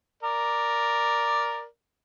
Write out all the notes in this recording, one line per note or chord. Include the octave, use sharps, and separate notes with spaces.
A#4 D5